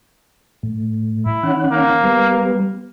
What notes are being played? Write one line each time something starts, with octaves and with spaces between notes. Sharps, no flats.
A2
E4
D#3 C#4 F#5
A#3
G3 B3